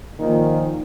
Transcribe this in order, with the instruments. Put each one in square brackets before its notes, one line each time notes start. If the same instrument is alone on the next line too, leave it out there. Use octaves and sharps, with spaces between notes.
[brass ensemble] A#2 F3 [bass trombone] D#3